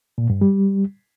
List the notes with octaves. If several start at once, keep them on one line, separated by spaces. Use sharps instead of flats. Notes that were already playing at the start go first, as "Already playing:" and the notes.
A#2
G2
G3